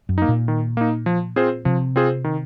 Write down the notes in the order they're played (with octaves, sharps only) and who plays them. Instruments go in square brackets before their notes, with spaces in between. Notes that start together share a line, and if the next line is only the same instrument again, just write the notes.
[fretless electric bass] F#2
[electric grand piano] A#3 D#4
[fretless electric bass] A#2
[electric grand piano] D#3
A#3 D#4
F3
C4 F4 G#4 C5
[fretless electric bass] C3 [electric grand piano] F3
[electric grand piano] C4 F4 G#4 C5
D#3